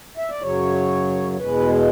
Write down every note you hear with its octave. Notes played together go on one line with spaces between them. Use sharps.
E5
D5
F#2 C#3 F#3 C#5
C#5
E2 B2 G#3 B4
G#4